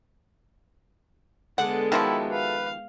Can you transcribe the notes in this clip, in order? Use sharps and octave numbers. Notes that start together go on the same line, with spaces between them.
D3 G#3 B3 D4 A4 F#5
D#3 F3 E4 F#4 G4 A4 E5
B4 F5